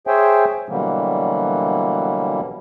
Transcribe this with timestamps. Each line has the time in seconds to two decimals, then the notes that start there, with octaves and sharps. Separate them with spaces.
0.07 G#4 C5 C#5 E5 G5 G#5
0.69 B2 D3 E3 F#3 G3 A#3